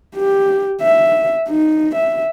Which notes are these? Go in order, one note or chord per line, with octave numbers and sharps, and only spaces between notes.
G4
E5
D#4
E5